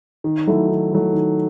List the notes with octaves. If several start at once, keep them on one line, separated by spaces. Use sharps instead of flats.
D#3
F#3 A3 E4
D#3
F#3 A3 E4
D#3